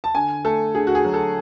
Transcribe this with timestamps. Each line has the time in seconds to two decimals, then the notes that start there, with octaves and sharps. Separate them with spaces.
0.04 A5
0.15 D3 G#5
0.45 A3 A4
0.75 D3 G#4
0.87 F#4
0.95 G#4
1.05 F#3
1.14 A4